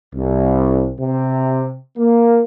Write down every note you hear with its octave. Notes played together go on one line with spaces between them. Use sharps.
C2
C3
A#3